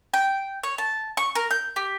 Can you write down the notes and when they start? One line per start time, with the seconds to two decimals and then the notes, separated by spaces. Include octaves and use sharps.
0.14 G5
0.63 C#5
0.78 A5
1.17 C#6
1.35 A#4
1.51 G6
1.76 G4